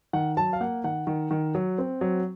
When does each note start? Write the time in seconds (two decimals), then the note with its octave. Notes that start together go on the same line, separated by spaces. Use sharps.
0.13 D#3 F#5
0.37 F#3 A5
0.53 F5
0.61 A#3 F#5
0.84 D#3 F#5
1.07 D#3
1.31 D#3
1.55 F#3
1.78 C4
2.01 F#3